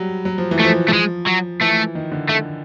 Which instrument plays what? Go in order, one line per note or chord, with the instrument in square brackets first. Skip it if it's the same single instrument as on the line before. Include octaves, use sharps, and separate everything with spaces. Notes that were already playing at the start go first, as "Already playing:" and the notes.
Already playing: [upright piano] F#3 G3
F#3
F3
E3
[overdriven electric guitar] A3
[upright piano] F3
[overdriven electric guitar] A3
G#3
F#3
[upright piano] E3 [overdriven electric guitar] A3
[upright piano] D#3
D3
[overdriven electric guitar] A3